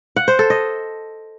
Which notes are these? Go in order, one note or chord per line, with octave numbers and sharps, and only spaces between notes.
F#5
C5
A4
D#5